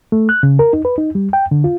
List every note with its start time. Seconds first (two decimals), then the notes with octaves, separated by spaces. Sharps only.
0.12 A3
0.29 F#6
0.43 C#3
0.59 A#4
0.73 D#4
0.85 B4
0.98 D#4
1.15 G3
1.33 G5
1.51 D3
1.64 F4